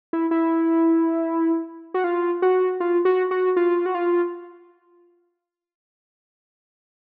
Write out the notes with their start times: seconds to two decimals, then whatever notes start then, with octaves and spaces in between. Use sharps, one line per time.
0.13 E4
0.31 E4
1.94 F#4
2.04 F4
2.42 F#4
2.80 F4
3.05 F#4
3.31 F#4
3.56 F4
3.86 F#4
3.95 F4